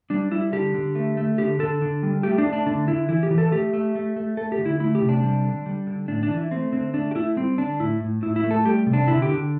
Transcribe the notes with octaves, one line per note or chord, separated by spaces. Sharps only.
G3 D4
G3 E4
D3 G4
D3
A3
A3
D3 G4
D3 A4
D3
G3
A3 G4
D4
A3
D4
D3 D4
D3 E4
E3 E4
G4
E3
A4
A3 G4
A3
A3
A3
A3 A4
G4
D3
E4
A3 E4
G4
C3
D4
G3
D3
G3
D3
A2 D4
D4
E3
E4
A3 C4
D3 C4
A3 D4
G4
A3 E4
G3 C4
D3 D4
A2 E4
A2
A2 E4
E4
A3
A4
G3 G4
C3
D4
D3 E4
G4
D3